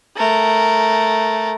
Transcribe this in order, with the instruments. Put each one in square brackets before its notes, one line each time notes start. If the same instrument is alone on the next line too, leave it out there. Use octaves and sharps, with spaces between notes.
[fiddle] A3 A#4